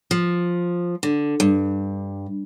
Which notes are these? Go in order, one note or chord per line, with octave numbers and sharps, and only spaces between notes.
F3
D3
G2